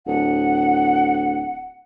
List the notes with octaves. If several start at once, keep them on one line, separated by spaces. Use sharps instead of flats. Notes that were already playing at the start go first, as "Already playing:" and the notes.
D1 F#5